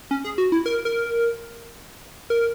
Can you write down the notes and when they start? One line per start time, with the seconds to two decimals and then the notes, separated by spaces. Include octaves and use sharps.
0.11 C#4
0.24 G#4
0.38 F#4
0.52 E4
0.66 A#4
0.85 A#4
2.30 A#4